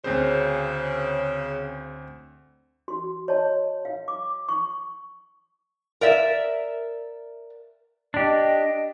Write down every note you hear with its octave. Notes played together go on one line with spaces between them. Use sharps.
D2 C#3 C4 C5
F#4 C6
C#5 D#5 A5
F5
D6
C#6
A#4 D5 E5
D4 G4 D#5